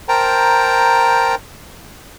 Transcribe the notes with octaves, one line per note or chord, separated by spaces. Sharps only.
A#4 C5 G5 A5 A#5